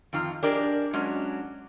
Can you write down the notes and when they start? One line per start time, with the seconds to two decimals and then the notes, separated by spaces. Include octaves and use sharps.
0.13 F2 D#3 F4 A#5
0.43 D4 G4 G#4 A#4 D5 D#5
0.93 F#3 G#3 C#4 D4